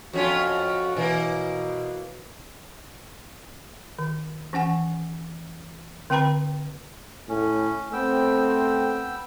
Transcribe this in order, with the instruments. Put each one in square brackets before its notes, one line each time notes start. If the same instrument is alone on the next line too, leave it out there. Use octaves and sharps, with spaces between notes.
[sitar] F2 C#4 F4 [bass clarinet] F#4
[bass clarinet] B2 [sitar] E3 A#3
[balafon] D#3
E3 C#4 F#5 G#5
D3 C4 B4 G5 A#5 B5
[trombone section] A2 [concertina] C#4
[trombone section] A3 C4 [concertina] B3 G5 E6